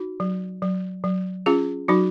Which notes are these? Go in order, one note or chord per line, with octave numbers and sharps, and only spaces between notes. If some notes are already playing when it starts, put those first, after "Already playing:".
Already playing: D#4 F#4
F#3
F#3
F#3
C#4 F4 G#4
F#3 D#4 F#4